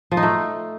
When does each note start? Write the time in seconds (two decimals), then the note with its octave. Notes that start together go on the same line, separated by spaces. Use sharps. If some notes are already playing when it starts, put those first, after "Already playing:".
0.11 F3
0.17 D#4
0.23 A3